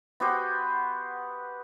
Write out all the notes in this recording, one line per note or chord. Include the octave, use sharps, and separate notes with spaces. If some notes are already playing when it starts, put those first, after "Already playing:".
B3 F#4 G4 C5